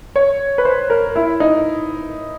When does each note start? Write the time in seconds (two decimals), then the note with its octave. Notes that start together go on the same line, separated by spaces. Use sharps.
0.16 C#5
0.58 B4
0.65 C5
0.90 A#4
1.16 E4
1.40 D#4